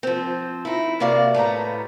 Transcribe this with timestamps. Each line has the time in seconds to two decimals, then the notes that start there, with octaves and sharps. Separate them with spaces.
0.03 F3 C4
0.65 D#4 E4
1.00 C3 A#3 F#4 D5 F5
1.34 A2 G3 B3 A#5